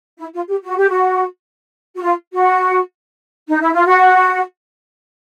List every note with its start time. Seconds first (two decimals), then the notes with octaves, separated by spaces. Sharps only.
0.18 E4
0.34 F4
0.49 G4
0.64 F#4
0.77 G4
0.90 F#4
1.96 F#4
2.02 F4
2.32 F#4
3.48 D#4
3.60 E4
3.73 F4
3.85 F#4